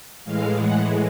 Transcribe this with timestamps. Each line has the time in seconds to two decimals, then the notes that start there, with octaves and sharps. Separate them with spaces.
0.25 A2 E3 G#3 F5
0.56 F#5